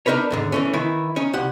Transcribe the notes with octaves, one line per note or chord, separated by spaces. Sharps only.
D4 D#4 A#4 B4 C#5
D#2 G#2 D3
E3 A3 C#4
D#3 E3 E4
C#4 D#4
C2 G4 F#5